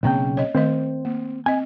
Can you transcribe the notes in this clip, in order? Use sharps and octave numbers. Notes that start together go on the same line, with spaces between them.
B1 C#3 A#3 C4 C#4 G5
C#5 D#5
D#3 A3 C4 C5 D#5
A#3
C4 D#5 G#5